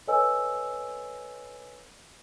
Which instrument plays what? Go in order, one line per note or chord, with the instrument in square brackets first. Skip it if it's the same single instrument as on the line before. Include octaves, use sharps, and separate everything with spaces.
[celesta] A4 B4 C#5 D#5 G#5 E6